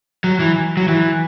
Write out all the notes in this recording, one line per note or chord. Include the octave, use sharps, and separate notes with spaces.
F#3
E3
F#3
E3